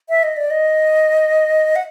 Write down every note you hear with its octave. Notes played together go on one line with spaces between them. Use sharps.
E5
D#5
D5
D#5
F#5